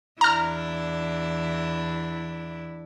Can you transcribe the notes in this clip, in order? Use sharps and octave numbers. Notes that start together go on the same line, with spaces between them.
E2 D4 E4 A#5 F6